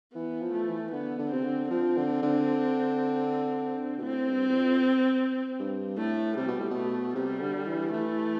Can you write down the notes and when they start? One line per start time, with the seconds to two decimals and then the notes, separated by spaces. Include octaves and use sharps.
0.14 E3 B3
0.41 F3
0.53 A3
0.67 E3
0.92 D3 B3
1.18 D3
1.31 C3 C4
1.44 D3
1.70 F3 C4
1.96 D3
2.22 D3
3.98 B2
4.03 A2 C4
4.29 G2
4.49 E2
4.55 F2
5.59 G2
5.98 A2 A3
6.37 C3 G3
6.47 B2
6.59 A2
6.70 B2
6.76 A3
7.15 C3 G3
7.40 D3
7.66 E3
7.92 E3 A3